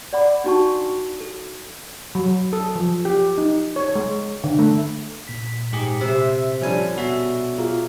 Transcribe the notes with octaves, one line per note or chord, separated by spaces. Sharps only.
D5 F#5 B5 D6
D4 D#4 F#4 G5 A5 C#6
A4
F#3
A4
F3
G4
D#4
C#5
G#3
D3
A3
A#2 B6
G#2 G4 G#4
C3 C5 E5
D3 F3 G3 C#4 G#5
B2 F#4 E5
A#3 F4 G#4